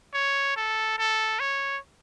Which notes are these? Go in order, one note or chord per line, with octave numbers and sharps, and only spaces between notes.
C#5
A4
A4
C#5